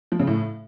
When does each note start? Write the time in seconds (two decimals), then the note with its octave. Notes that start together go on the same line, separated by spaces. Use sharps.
0.12 F3
0.20 C#3
0.27 A2